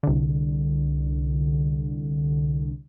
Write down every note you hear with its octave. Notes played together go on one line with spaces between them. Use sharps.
C2 D3